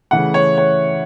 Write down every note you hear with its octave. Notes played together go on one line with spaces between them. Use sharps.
C#3 E3 A3 F#5
C#5
C#5